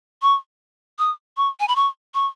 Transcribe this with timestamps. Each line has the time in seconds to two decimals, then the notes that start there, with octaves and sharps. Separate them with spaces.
0.22 C#6
0.99 D#6
1.37 C#6
1.60 G#5
1.68 B5
1.76 C#6
2.14 C#6